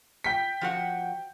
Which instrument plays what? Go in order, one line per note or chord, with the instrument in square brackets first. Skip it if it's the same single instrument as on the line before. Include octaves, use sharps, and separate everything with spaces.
[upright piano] G5 B6
[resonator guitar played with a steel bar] F3 F#4 F#5